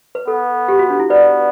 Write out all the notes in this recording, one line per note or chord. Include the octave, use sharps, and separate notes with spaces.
B4
B3 A4
G4
F#4
D4
E4
B3 B4 D5